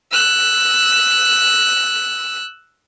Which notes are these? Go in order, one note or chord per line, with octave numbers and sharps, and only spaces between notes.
E6 F#6